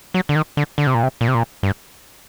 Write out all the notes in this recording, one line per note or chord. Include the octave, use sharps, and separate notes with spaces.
F#3
D3
D#3
D3
D3
C3
A#2
C3
A#2
C3
A#2
G2